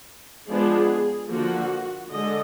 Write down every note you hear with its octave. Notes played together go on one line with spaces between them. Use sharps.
F3 G#3 B3 D4 G#4
D3 F3 A#3 F#4
D3 G#3 D#5